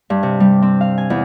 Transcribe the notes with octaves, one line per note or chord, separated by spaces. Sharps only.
G2
C3
G3
C4
F5
G#5
E2